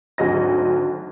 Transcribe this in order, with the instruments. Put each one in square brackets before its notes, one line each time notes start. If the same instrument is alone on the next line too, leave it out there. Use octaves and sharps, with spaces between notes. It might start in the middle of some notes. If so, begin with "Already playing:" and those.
[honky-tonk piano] G#1 D2 F#3 D#5 A#6